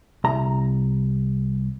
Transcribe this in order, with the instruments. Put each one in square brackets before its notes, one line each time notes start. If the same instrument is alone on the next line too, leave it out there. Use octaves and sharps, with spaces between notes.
[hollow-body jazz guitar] C2 A#5